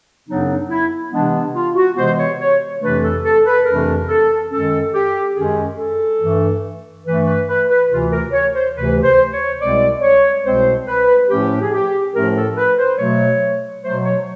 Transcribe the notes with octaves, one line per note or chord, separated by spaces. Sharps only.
F#2 C#3 F#3 B3 D4 D#4
D#4
E4
C3 E3 G#3 B3 D4
D4
F4
F#4
C3 E3 G#3 B3 C5
C#5
C#5
F2 C3 E3 A3 D4 B4
A4
A4
B4
F2 C3 E3 A3 D4 A#4
A4
F#2 D#3 G#3 C#4 A4
G4
F#2 D#3 G#3 C#4 G#4
A4
G2 E3 A3
G2 E3 A3 B4
B4
B4
B4
D2 C3 E3 F4
A#4
C#5
C5
D2 C3 E3 B4
C5
C#5
C2 B2 G#3 C4 D5
C#5
C2 B2 G#3 C4 C5
B4
A2 F3 A3 C#4 G4
G#4
G4
A2 F3 A3 C#4 A#4
A4
B4
C5
B2 F#3 A3 C#5
B2 F#3 A3 C5
C#5